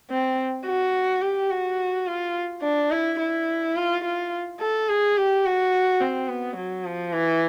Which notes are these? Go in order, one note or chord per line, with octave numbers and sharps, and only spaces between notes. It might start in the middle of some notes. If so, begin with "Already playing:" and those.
C4
F#4
G4
F#4
F4
D4
E4
E4
F4
F4
A4
G#4
G4
F#4
C4
B3
F#3
F3
E3